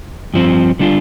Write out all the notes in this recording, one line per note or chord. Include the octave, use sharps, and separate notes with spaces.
G2 F3 C4
D3 G3 D4 F4